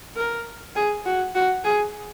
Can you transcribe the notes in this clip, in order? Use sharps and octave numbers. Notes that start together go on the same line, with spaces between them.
A#4
G#4
F#4
F#4
G#4